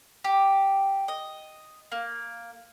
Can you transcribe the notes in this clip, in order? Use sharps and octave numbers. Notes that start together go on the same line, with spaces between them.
G4
D#5
A#3